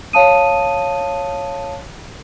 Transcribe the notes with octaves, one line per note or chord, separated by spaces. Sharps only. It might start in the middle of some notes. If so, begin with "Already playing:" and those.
C#5 F5 A5 D#6 D#7